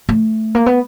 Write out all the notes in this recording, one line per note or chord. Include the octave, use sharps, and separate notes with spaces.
A3
A#3
B3